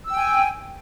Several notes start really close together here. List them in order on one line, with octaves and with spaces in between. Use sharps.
E6 G5 G#5